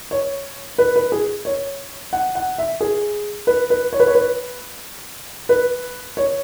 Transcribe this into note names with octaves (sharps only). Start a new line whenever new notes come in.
C#5
B4
B4
G#4
C#5
F#5
F#5
E5
G#4
B4
B4
C#5
B4
C#5
B4
B4
C#5